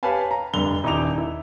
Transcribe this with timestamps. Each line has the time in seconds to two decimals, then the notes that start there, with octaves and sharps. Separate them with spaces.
0.03 G4 B4 C#5 F5 G#5 A5
0.31 A#5
0.53 F1 G2 D3 F7 G7
0.84 D#1 D#4 E4 D#5 D6 F7
1.18 E4